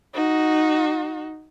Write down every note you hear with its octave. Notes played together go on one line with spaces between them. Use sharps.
D#4 F#4